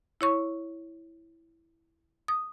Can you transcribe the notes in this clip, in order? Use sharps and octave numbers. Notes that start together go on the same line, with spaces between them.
E4 C#5 C#6
D#6